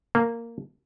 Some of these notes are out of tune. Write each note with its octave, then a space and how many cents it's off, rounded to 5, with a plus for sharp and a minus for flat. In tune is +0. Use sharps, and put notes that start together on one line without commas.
A#3 -10